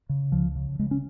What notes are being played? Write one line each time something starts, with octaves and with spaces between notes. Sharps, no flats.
C#3
C#2 F3
C#3
C#3 G#3
C#4